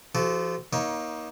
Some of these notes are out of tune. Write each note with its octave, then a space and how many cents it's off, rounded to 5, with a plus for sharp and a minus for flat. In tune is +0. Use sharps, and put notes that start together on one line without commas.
F3 -25 F#4 +35 A4 -20
A#3 +30 D#4 +20 C#5 +0